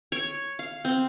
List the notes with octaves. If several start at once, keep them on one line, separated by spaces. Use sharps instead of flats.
C#5
F5
C4